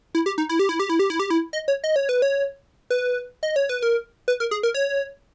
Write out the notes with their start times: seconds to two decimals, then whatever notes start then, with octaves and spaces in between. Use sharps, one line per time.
0.15 E4
0.26 G4
0.38 D#4
0.49 E4
0.59 G4
0.69 E4
0.80 G4
0.90 E4
0.99 G4
1.10 E4
1.20 G4
1.30 E4
1.53 D#5
1.68 C#5
1.84 D#5
1.96 C#5
2.09 B4
2.22 C#5
2.90 B4
3.43 D#5
3.56 C#5
3.69 B4
3.82 A#4
4.28 B4
4.40 A#4
4.51 G#4
4.63 A#4
4.74 C#5